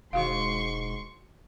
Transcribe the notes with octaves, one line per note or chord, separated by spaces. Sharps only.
E1 G#2 D#3 F#4 F5 C6 C#6